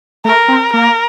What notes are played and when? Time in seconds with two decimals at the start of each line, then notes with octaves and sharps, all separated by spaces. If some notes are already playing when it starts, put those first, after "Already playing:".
0.25 A3 A#4
0.48 C4
0.73 A#3 A#4